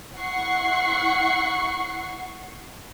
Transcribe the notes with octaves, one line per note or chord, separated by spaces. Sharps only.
E4 F#5 C#6 C7